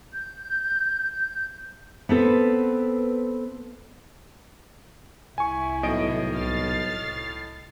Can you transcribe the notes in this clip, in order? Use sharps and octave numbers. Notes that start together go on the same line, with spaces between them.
G6
B3 C4 A4 B4
C2 E4 G#5 C#6
B1 A2 D#5 D7
F6 A6 C7